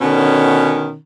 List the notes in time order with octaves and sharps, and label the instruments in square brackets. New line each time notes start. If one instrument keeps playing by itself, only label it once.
[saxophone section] B2 D3 D#3 C#4